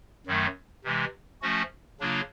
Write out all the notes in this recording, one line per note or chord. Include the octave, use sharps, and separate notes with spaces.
F#2 D#3 F#3 A3
C3 E3 G#3
F3 A3 C#4 F#4
C#3 F#3 A#3 D4 F4